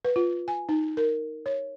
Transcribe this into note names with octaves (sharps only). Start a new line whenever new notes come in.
B4
F4
G#5
D#4
A#4
C#5